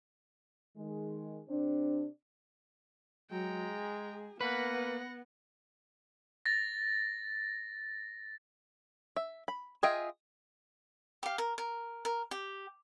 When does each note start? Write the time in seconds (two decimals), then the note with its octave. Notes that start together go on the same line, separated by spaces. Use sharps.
0.77 D#3 G#3
1.49 C3 C4 D4
3.31 F#3 G#3 G5 A#5
3.70 G#4
4.41 A#3 B3 B4 F#5 A#6
6.46 A6 A#6
9.16 E5
9.48 B5
9.83 F4 G#4 D#5 E5 G5
11.23 G4 F5
11.38 A#4
11.58 A#4
12.05 A#4
12.31 G4